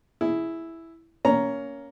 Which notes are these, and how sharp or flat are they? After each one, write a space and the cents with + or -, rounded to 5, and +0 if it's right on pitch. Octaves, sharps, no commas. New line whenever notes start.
E4 +0 G#4 +0
A#3 +0 C#4 +15 A#5 +0